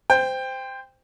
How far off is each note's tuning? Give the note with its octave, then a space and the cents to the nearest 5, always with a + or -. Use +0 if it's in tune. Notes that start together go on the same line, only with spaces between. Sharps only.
C5 -15 G5 +15